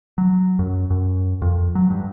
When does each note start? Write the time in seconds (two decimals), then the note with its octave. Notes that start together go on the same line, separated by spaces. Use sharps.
0.18 F#3
0.59 F#2
0.90 F#2
1.42 F2
1.75 F#3
1.90 G2